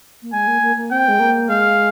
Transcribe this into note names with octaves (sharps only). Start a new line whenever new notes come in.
A#3
G#3 G#5
A#3
A#3
A#3
C4 G5
G#3
A#3
G#3 F5